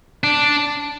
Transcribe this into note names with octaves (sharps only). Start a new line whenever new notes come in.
D4